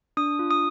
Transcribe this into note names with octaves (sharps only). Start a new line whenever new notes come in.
D4 D#6
F4
D#6